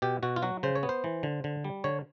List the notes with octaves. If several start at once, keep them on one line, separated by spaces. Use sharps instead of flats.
B2 G4
B2 F#4
F4
F#3 F#4
C#3 C5
C#5
B3
C5
E3
D3
D3
G3
D3 C#5